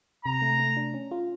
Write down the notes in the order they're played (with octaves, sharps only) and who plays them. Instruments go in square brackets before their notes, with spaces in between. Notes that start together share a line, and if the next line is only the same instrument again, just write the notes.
[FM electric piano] C3 [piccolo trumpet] A#5
[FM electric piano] A3
A3
D4
C#4
F4